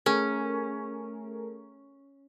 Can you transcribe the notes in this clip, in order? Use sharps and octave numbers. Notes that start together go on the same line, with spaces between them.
A3 C#4 G#4 A#4